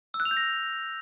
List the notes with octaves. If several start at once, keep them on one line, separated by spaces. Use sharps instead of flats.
E6
F#6
F7
G6
A#6